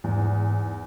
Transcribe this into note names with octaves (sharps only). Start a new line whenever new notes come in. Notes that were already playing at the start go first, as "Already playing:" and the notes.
E2 G#2